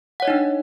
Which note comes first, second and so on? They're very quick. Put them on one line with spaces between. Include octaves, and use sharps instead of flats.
F#5 C#5 D#5 D#4 D4